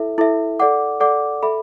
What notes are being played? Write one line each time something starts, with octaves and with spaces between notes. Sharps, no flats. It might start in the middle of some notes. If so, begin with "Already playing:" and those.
Already playing: E4 A4 E5
E4 A4 E5
A4 D5 F#5 D6
A4 D5 F#5 D6
A4 E5 B5